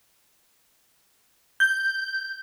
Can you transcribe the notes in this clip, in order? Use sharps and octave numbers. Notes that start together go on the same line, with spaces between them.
G6